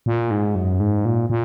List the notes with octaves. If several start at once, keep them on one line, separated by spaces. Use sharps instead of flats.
A#2
G#2
F#2
G#2
A#2
A#2